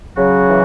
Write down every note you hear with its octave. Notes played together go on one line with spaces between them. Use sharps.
C#3 F#3 F#4
E3